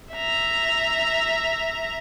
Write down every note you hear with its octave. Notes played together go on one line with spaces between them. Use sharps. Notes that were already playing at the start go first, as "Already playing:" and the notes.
E5 A#5